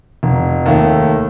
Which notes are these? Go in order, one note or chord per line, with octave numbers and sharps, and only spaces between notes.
F1
D#2 D#3 A3